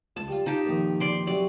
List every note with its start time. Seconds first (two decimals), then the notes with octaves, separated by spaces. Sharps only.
0.16 C#2 A5
0.28 G3 F4
0.46 D#4 F4 G4 A5
0.65 A#1 F2 D#3
1.00 D5 C6 D6
1.27 C3 F#3 F#4 D5